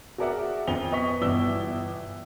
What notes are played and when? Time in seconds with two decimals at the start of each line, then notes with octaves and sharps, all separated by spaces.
0.18 F#4 G#4 A#4 D5 E5 F#5
0.67 F2 F7 G7
0.92 B3 D#5 C#6 B6
1.22 G1 B2 E3 D5 E6 G7